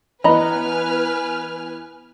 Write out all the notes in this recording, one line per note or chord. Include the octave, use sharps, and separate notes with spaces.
E3 B3 B4 D#5 G#5 A#5 B5 F6